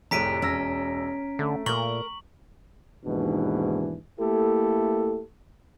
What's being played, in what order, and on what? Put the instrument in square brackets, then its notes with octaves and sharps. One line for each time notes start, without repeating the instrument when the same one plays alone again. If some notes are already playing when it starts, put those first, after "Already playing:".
[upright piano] F1 A2 D#7 [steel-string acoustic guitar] G4 G#4 [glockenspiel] A#5 B6 D7
[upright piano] E1 E6 A#6 [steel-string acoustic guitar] C#4
[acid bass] D3 [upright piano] A3
[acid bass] A#2 [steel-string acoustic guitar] A#4 A#5 [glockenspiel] C#6 F#7
[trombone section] D#2 G#2 B2 E3 D4
A3 A#3 E4 G4 A4